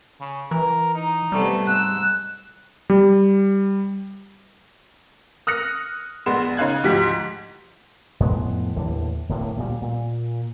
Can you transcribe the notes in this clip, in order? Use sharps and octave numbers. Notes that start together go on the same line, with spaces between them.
C#3
E3 A#4
D#4
C3 G3 A3 B3
G#2 E6 F#6
G3
D#6 F6 F#6 A#6 C#7
A#1 G#3 B3 C6 E7
C#3 D#4 F5 F#6 G#6
D2 G#2 F3 G4 B6
F2 A2 G#3 B3
D#2 A2 D3 E3
D1 A2 D3 A#3
D2 A#2 G3
A#2